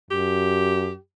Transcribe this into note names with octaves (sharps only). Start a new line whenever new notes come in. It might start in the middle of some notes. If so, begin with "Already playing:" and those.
F#2 G4